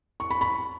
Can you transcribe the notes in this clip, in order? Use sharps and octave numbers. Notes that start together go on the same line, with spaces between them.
C#6
B5
B5